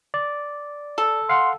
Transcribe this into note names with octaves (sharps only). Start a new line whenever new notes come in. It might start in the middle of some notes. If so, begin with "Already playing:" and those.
D5
A4
F5 F#5 C6